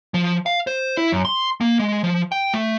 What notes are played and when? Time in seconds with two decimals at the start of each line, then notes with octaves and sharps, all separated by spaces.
0.14 F3
0.46 F5
0.67 C5
0.97 E4
1.12 F#2
1.25 C6
1.61 A#3
1.79 G#3
2.04 F3
2.32 G5
2.54 A3